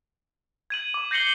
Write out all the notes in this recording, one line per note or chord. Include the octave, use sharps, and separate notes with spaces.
G#6 D#7 F#7
D6
G6 A#6 C7 C#7 F#7 G7